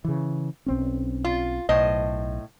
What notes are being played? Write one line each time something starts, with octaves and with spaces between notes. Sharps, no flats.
C#3 E3
B1 C4 C#4
F4
B1 A2 C5 D#5